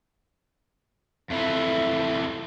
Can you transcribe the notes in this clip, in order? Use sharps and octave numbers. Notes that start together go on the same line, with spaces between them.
F2 E3 A3